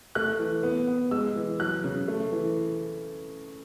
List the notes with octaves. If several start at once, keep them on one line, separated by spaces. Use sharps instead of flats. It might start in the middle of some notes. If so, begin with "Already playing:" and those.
A3 F#6
E3
B3
B3
G#3 E6
E3
F#3 F#6
C#3
A3
E3